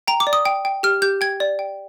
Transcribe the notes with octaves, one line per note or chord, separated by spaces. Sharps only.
G5 A#5
D6
D5
D#6
G5
G5
G4 F6
G4 G6
G5 G#6
D5
G5